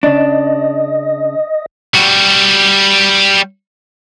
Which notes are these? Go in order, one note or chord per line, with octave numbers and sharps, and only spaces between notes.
C#3 D4 D#5
G3 F#4